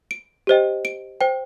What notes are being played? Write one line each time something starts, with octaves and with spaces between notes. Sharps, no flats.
D7
G4 C5 D#5 G5
D7
C5 G5